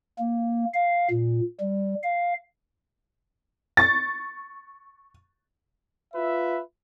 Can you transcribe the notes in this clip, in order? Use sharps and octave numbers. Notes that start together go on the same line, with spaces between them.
A#3
F5
A#2
G3
F5
C#6 A6
F4 B4 E5